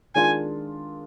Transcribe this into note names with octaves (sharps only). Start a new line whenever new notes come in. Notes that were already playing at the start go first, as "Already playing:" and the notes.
D#3 G#3 D4 F4 G#5